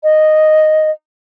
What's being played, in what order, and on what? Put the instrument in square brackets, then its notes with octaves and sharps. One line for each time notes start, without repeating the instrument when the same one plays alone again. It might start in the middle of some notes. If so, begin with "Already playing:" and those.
[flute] D#5